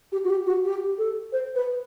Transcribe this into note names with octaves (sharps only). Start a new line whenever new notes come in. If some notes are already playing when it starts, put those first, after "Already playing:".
G4
F#4
G4
F#4
G4
A4
C5
B4